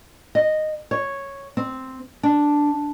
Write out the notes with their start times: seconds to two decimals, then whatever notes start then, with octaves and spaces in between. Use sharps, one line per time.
0.35 D#5
0.91 C#5
1.57 C4
2.23 D4